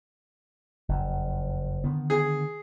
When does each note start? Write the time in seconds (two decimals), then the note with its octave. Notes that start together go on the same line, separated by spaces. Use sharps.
0.89 F#1 F2
1.84 D3 D#3 B3
2.10 G#4